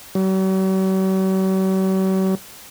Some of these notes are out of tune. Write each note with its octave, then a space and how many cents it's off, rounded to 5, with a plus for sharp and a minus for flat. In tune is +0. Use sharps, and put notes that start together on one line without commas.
F#3 +45